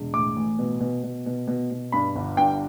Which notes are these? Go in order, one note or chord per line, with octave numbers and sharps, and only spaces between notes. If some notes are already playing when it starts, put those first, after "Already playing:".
Already playing: E1
A2 D6
A1
B2
B2
B2
B2
B2
B2
G2 B5
G1
G2 G5